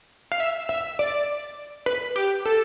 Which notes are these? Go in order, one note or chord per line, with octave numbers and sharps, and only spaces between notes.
F5
E5
E5
D5
B4
G4
A4